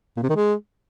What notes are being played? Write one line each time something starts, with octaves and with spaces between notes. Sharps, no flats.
A#2
C3
D#3
G#3